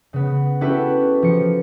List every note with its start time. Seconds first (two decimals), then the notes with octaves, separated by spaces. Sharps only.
0.13 C#3 B3
0.61 C#4 E4 F#4 G4 A4 B4
1.22 F3 C#7